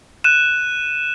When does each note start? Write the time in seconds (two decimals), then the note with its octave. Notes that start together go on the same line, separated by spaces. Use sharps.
0.24 F#6 D#7 E7